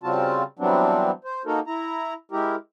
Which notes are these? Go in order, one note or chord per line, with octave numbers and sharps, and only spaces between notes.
C#3 G3 C4 F4 F#4 A5
E3 F#3 G3 B3 C4 D4
C5
A#3 D#4 F#4 A4 A#4
E4 A#5
G#3 E4 G4 A#4